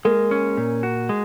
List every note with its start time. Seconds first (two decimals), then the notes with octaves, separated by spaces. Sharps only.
0.05 G#3 A#3 A#4
0.31 C#4
0.57 A#2
0.83 F#4
1.09 G#3